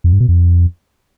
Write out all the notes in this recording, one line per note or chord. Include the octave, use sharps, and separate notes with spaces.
F2
G2
B2
F2